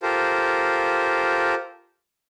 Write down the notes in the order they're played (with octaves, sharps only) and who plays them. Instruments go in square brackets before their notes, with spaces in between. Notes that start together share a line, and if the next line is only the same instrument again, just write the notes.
[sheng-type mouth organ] F4 G4 A4 A#4 C5